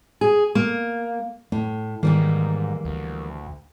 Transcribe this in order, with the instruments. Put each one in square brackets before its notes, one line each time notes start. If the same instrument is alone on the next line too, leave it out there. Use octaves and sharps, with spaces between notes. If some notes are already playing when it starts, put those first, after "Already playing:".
[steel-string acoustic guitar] G#4
A#3
[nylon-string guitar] A2 [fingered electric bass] A3
[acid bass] G#2 [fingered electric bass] D#3 [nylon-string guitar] E3 G3 A#3
[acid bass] D2